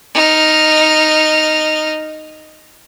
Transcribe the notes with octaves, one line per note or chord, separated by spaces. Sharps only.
D#4 F6